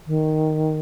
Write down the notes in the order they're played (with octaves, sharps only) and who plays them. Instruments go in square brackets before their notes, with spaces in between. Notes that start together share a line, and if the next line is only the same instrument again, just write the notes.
[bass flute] D#3